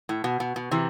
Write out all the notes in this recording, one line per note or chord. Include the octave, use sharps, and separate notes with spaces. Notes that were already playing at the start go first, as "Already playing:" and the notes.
A2
B2
B2
B2
C3 E3